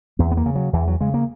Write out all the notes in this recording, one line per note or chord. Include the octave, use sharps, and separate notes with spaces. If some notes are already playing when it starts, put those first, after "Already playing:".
E2 B3
B3
A#3
C#3
F#3
E2 E3
F#3
C#3 G#3
A#3